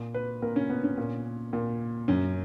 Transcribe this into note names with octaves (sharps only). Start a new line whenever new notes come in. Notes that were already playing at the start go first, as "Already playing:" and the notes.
Already playing: A#2
B4
A#2 A#4
C#4
B3
C#4
A#2
A#2
F#2 C#4